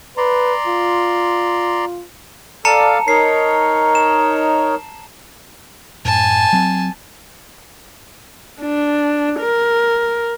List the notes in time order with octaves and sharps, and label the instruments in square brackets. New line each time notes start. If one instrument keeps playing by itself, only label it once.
[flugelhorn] B4 [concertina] D5 A#5 C6
[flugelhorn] F4
[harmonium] A4 D5 F5 [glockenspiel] A5 A#5 C#7
[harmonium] D#4 A#4 C#5 [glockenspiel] C7
[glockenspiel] E7
[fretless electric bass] F#2 A2 [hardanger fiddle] G#5 A5
[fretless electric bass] F#3 C4
[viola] D4
A#4